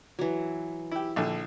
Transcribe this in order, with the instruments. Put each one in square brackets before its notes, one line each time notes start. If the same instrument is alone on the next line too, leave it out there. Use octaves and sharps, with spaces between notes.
[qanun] E3 F#3
[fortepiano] E4 G4
A#1 D3